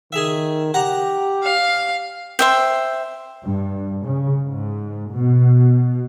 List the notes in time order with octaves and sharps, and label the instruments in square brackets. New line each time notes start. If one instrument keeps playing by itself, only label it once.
[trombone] D#3 [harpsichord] G#4 E5
[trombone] G4 [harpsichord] F#5 A#5
[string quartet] F5
[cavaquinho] C5 E5 G5
[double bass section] G2
C#3
G#2
B2